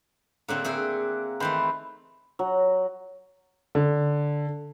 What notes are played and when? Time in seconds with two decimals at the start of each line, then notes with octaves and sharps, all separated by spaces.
0.48 A2 D3 A#3 C4 F#5
0.64 C4 G#4 E5 G5
1.40 D#3 E3 A3 B4 G5 C6
2.39 F#3
3.75 D3